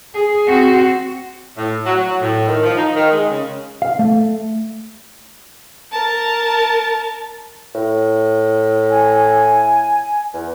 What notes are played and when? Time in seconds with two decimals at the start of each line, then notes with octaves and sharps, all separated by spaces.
0.14 G#4
0.47 C4 F#4
1.57 A2
1.86 F#3
1.97 F#3
2.21 A2
2.48 D#3
2.64 F3
2.77 D#4
2.95 D#3
3.12 G#3
3.31 C#3
3.82 F5
3.99 A3
5.92 A#4 A5
7.75 A2
8.90 G#5
10.34 E2